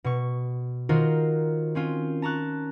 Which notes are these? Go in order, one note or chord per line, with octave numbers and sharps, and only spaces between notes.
B2 C#6
D#3 F4 F#4 A#4 C5
C4 C#4 F4
A5 A#5 C#6 F#6